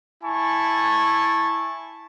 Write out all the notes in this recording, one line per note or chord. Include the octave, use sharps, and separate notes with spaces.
E4 G#5 A5 C#6